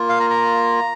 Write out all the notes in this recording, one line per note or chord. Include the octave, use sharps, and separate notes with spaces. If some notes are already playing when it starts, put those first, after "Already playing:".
Already playing: A#3 F4
F5
A#5
A#5